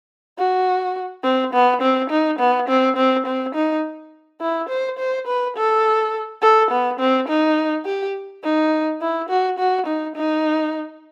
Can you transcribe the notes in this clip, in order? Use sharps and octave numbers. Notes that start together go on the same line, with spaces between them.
F#4
C4
B3
C4
D#4
B3
C4
C4
C4
D#4
E4
C5
C5
B4
A4
A4
B3
C4
D#4
G4
D#4
E4
F#4
F#4
D#4
D#4